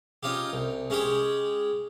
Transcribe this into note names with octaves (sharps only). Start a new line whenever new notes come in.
C#4 D#4 F4 G4
C2
G#3 C#4 G4 G#4 C#5